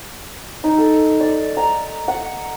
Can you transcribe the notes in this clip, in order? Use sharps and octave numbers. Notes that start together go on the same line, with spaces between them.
D#4
A4
D5
A#5
F#5